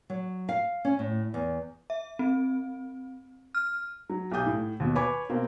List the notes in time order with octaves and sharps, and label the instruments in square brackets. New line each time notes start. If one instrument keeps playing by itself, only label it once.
[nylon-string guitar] F#3
F5
C#4
A2
E2
[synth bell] E5
C4
F6
[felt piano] F#3
B1 G4 D#6 G6
A2
D#2 B2
B4 C#5 G#5 B5 D6 G#6
B2 A#3 C4